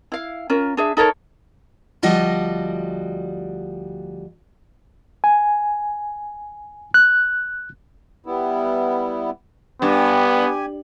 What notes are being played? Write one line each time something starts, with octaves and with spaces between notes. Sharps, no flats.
E4 F5
C#4 F4 A#4
D4 G#4 E5
D#4 A4 A#4 C#5
D2 F3 G3 F#4 D#5
G#5
F#6
G3 B3 E4
G2 B3 G4 G#5